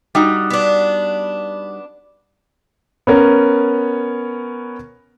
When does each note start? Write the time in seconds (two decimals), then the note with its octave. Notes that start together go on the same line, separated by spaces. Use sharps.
0.15 G3 D#4 F#4
0.50 B3 D4
3.07 B3 C#4 A#4